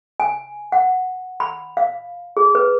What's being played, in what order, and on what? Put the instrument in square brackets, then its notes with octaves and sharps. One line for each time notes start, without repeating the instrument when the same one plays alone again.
[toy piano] G#5
F#5
B5
F5
G#4
B4